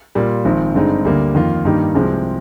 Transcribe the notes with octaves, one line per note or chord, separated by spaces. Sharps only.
A#2 G3 A#3 F4
G#1 G#2 F3 C4
G2 D3 G#3 C4 D#4
D2 D3 G3 A#3
F2 D#3 A#3 F4
G2 D#3 A#3 D#4 G4
C2 C3 F3 G#3 C4